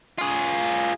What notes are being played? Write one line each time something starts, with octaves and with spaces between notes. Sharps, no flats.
F4 G#4